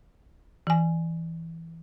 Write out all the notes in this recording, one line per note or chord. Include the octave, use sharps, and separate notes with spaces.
E3 G#5